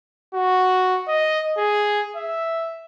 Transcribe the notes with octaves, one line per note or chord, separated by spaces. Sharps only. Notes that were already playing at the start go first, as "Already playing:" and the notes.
F#4
D#5
G#4
E5